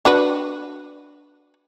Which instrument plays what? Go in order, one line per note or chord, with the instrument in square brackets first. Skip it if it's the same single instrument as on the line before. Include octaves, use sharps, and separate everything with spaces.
[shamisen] D4 F#4 B4